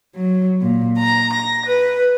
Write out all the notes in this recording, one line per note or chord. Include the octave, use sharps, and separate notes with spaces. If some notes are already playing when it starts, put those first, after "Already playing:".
F#3
A#2
A#5
A#6
B4